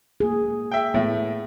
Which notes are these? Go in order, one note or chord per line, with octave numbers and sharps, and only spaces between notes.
A#3 G#4
E5 G5
A2 B3